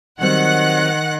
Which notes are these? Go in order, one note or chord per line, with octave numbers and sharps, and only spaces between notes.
D#3 F#3 G3 C4 F#5 F#6